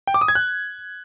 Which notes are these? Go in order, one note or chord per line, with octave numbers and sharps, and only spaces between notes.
G5
D6
D#6
G#6
F#6